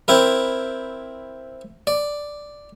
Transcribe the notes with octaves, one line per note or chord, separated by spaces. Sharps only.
C4 E4 A#4
D5